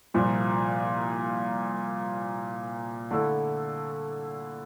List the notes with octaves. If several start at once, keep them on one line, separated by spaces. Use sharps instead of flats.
C2 A#2 F3
D3 A3 E4 A4